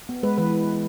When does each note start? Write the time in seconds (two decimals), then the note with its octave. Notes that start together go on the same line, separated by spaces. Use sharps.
0.09 B3
0.23 G#3 B4
0.38 E3 B4